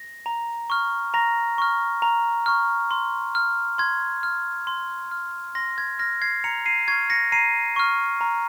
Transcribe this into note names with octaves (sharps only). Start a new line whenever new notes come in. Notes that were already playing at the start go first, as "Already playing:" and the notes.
Already playing: A#6
A#5
C#6 F6
A#5 A#6
C#6 F6
A#5
C#6 F6
C6
F6
C6 G#6
F6
C6
F6
C6 A#6
G#6
F6 A#6
G#6 C7
A#5 C#7 F7
C7 D#7
C#6 F6 G#6 C7
A#6 C#7
A#5 C7 D#7
C#6 F6
A#5